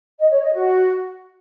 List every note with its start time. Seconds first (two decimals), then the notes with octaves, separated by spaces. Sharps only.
0.19 D#5
0.31 C#5
0.42 D#5
0.54 F#4